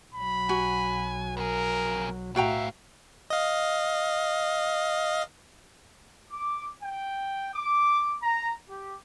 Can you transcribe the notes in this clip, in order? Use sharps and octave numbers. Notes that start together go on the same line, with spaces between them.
B1 F#3 B5
F#4 G#5
F2 G#4 A#4
A2 B3 F#4 E5 F5 G5 A#5
D#5 F5
D6
G5
D6
A#5
G4